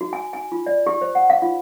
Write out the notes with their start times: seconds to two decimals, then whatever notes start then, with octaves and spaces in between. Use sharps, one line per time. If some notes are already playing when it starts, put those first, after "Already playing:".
0.01 F#4
0.13 G#5
0.33 G#5
0.52 F4
0.66 D5
0.86 G4
1.02 C5
1.15 F#5
1.30 F5
1.42 F4